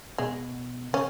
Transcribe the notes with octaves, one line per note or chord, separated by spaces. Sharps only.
B2 G#3
C#3 C#4